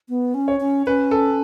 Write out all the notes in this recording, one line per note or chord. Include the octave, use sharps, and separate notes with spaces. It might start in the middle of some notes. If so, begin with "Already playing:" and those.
B3
C#4
C#5
C#4
C#4 B4
A4